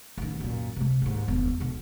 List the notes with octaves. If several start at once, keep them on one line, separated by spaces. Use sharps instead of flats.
A1 D#3
F#2 A#2
C3 G#3
D#2 G#2
E1 D#2
B2 D3